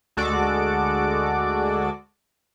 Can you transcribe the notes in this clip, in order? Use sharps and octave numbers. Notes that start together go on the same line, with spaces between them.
D2 G#3 F#4 A4 D5 D6